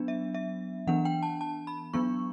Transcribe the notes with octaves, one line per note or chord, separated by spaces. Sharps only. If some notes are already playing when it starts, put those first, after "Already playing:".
Already playing: F#3 B3 D4
E5
E5
E3 B3 D4 F#5
G5
A5
A5
B5
F#3 B3 D4 C#6